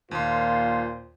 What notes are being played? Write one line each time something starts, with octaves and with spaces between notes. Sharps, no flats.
D#2 A#2 F4 C5 C6